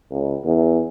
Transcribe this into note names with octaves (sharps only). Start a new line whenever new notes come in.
C#2
E2